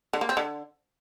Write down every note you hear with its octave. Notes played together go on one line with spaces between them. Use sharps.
D3
A#3
C4
D3